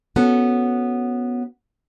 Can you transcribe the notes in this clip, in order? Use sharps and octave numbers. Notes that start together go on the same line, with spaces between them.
B3 C#4 F#4 A4